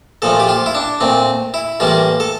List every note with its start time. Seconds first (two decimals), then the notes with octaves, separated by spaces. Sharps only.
0.22 A#2 F3 A3 A4
0.40 G4
0.49 F4
0.66 E4
0.75 D4
1.01 A#2 A3 C4
1.54 E4
1.80 A2 E3 G3 A#3 F4
2.20 A4